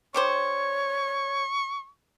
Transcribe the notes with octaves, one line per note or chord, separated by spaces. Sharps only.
D3 G4 C5 C#5 C#6